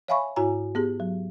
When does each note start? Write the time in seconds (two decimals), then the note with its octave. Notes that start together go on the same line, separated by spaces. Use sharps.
0.08 C#5 E5 F5 G#5 B5 C#6
0.36 G#2 E4 F#4 C#5 G#5 A#5
0.75 B3 G4 G#4
1.00 F#3